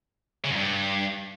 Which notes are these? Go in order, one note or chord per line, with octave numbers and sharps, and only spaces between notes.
C#3
F#2
G2